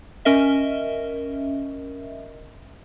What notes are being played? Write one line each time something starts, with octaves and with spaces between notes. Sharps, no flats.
C#4 A#4 D#5 E5